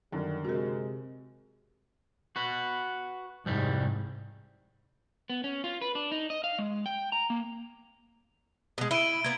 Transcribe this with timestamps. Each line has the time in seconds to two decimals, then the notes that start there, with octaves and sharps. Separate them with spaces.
0.13 F#2 D3 D#3 G3
0.45 C3 G#3 F#4 A#4
2.36 F#4 B4
3.46 C2 F2 G#2 G3
5.30 B3
5.44 C#4
5.64 F4
5.81 B4
5.95 D4
6.12 D#4
6.30 D#5
6.44 F5
6.59 G#3
6.86 G5
7.12 A#5
7.30 A#3
8.78 B2 G#3
8.91 E4 D7 D#7 G7
9.24 A#3 B3 G#6 G7